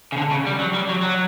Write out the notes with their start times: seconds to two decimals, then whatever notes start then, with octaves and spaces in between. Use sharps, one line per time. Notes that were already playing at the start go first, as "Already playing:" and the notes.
0.12 C#3
0.17 D3
0.31 C#3
0.46 G3
0.60 F#3
0.74 G3
0.89 F#3
1.03 F#3